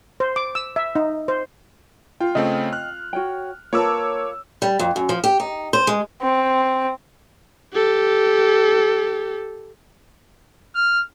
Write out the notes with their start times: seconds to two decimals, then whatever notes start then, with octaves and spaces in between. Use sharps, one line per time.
0.20 C5
0.36 D6
0.55 E6
0.76 E5
0.95 D#4
1.28 C5
2.20 F4 G5
2.35 C#3 A3 C4 D#5 G5
2.73 F6 F#6
3.13 F#4 C#5 G5
3.73 A#3 F4 A#4 B4 C#5 A5 D6 E6
4.62 G3
4.79 F2
4.96 F#2
5.09 F3
5.24 G4
5.40 D#4
5.73 C5
5.87 G#3
6.22 C4
7.73 G4 A4
10.75 F6